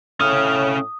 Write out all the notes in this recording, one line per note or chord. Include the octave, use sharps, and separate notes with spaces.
A2 C#4 F5 D#6